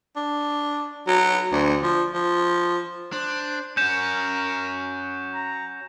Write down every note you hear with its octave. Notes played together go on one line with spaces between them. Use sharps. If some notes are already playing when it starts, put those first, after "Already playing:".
D4
F#3
D2
F3
F3
D4 C5
C#4 F#4 A#4 G6 E7
A#5